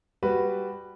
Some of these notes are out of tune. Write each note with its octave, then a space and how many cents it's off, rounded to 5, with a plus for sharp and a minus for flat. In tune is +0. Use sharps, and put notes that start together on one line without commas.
G3 +0 F#4 +0 B4 +0